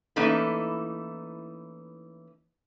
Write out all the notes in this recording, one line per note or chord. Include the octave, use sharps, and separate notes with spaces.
E3 A3 A#3 C#4 D#4 E4